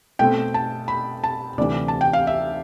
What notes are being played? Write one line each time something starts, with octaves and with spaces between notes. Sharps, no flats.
B2 A3 C4 G5
A5
B5
A5
D2 C3 E3 D5
A5
G5
F5
E5